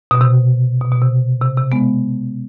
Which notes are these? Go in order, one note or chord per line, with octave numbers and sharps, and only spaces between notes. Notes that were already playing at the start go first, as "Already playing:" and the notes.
B2
C3
B2
B2
C3
C3
C3
G#3 B3